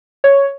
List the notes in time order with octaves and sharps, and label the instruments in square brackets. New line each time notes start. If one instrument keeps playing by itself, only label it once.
[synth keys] C#5